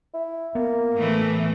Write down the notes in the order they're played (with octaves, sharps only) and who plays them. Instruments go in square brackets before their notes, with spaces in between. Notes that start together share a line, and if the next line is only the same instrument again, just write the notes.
[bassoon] E4
[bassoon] A#3 [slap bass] B3
[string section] A2 E3 A3